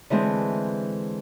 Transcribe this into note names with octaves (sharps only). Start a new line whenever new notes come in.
D3 E3 G#3 C4